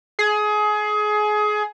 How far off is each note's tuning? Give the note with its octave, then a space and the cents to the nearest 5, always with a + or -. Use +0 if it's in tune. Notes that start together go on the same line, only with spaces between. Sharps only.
G#4 +25